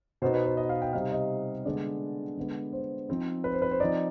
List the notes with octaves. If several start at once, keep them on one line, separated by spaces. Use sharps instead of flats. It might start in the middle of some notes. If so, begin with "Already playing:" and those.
B2 B3 D#4 C5
B4
C5
D#5
F5
G5
C3 G3 C4 D#4 F5
D#5
D3 G#3 B3 D4 D5
D3 G#3 B3
C5
F3 C4 D#4
B4
C5
B4
C5
F3 C4 D#4 D5